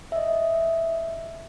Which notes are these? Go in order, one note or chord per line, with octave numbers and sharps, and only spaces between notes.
D#5 E5